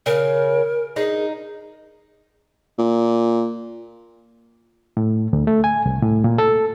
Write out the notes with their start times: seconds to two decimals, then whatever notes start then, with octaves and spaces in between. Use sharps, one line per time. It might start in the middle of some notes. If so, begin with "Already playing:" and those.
0.06 C#3 A#4
0.96 D#4 G#4
2.79 A#2
4.97 A2
5.33 D2
5.47 A3
5.64 G#5
5.86 C2
6.03 A2
6.24 A#2
6.38 A4